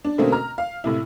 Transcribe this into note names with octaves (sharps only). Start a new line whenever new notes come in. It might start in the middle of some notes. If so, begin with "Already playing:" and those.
D4
B2 D3 A3 A#3 C4 C#4
A#5 F6
F5
A2 C3 E4